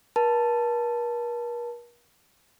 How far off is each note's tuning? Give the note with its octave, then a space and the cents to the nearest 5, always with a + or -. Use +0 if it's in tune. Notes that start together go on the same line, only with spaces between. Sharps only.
A#4 +45 A5 +0